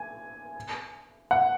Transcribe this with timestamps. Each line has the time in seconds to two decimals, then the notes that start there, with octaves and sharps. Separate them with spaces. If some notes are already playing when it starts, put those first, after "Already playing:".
Already playing: G#5
1.31 F#5